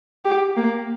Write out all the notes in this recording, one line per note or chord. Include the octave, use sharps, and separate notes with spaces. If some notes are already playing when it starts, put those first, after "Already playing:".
G4
A#3